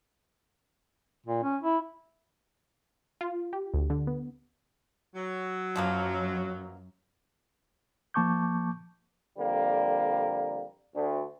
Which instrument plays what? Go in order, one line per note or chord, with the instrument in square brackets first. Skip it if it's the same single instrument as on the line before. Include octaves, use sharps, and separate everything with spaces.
[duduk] A#2
C#4
E4
[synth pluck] F4
G4
D2
D3
B3
[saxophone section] F#3
[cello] F#2 [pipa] B2 F3 A#3
[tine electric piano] F3 A#3 A5 C#6 D6 G6
[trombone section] F2 D3 G3 A#3
D2